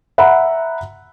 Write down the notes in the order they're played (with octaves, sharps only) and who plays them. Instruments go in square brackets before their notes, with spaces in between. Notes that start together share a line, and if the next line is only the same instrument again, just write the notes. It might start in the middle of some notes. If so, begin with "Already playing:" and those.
[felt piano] E5 F#5 A#5 B5